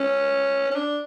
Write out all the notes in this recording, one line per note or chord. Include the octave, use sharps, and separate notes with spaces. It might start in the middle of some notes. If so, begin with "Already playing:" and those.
Already playing: C#4
C#4
D4